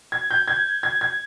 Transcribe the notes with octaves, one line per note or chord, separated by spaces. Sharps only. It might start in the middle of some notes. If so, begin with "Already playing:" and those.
G#6
G6
G#6
G#6
G#6